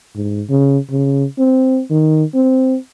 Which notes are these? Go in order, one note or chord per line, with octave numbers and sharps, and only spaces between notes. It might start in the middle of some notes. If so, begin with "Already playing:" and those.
G#2
C#3
C#3
C4
D#3
C4